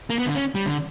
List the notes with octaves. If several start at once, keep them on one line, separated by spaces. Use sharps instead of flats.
A#3
B3
D3
C#4
G3
D3